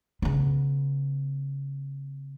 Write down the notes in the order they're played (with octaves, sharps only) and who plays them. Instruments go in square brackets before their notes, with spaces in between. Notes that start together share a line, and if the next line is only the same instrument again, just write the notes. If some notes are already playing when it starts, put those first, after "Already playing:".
[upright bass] C#3 B3